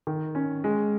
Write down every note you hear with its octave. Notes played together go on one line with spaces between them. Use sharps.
D#3
C#4
G#3